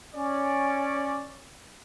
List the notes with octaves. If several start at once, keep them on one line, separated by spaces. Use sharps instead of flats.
C#4 D5